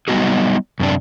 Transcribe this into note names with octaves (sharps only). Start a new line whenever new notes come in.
F#3 G3 B3 D#4 F#4 G#4
F#2 C3 D4